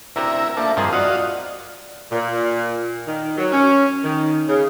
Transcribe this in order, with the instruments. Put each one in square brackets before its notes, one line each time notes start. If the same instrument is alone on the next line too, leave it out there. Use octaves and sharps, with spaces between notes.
[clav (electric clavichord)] D2 C3 [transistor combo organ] E4 A#4
[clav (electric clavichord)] F3 [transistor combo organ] A#3 D4 A4 [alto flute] E5
[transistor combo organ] G2 C4 [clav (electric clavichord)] D#3 F3 G#4 [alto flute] A#4
[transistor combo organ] F4 F#4 D#5 [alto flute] D5 [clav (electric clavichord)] F5 F#5
[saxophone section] A#2
D#3
F#3
C#4
D#3
C#3